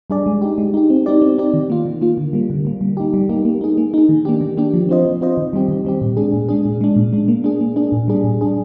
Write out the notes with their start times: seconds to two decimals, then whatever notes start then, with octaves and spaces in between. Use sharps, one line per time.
0.10 G3 D4 G#4 D5
0.26 G#3
0.42 D#4 G4
0.58 G#3
0.74 D#4 G4
0.90 C4
1.06 D#4 G4 D5
1.22 C4
1.38 D#4 G4 D5
1.54 D#3
1.70 A#3 F4
1.86 D#3
2.01 A#3 F4
2.17 D3
2.33 G3 A#3
2.50 D3
2.65 G3 A#3
2.81 G3
2.97 A#3 D#4 G4
3.14 G3
3.29 A#3 D#4 G4
3.45 A#3
3.61 D#4 G#4
3.78 A#3
3.94 D#4 G#4
4.09 D#3
4.25 A#3 D4 G4
4.41 D#3
4.57 A#3 D4 G4
4.74 F3
4.89 C4 F4 C5 D#5
5.05 F3
5.21 C4 F4 C5 D#5
5.37 D#3
5.53 G3 C4 G4
5.69 D#3
5.85 G3 C4 G4
6.02 A#2
6.17 G#3 D4 G#4
6.33 A#2
6.49 G#3 D4 G#4
6.65 A#2
6.81 G#3 D4
6.96 A#2
7.13 G#3 D4
7.28 A#3
7.44 D4 G#4
7.61 A#3
7.76 D4 G#4
7.92 A#2
8.08 G3 D4 G#4
8.24 A#2
8.41 G3 D4 G#4